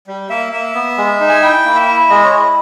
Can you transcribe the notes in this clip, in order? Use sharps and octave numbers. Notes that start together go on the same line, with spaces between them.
G3
A#3 E5
A#3 E5
B3
G#3
D#4
G#5
E4 G5
A#3
E5
E4
G#3 D#5
C#5
E4 D#5